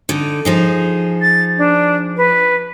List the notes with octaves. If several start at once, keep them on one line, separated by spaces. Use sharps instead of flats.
D3 D#4
F3 D#4 G#4
A6
D4
B4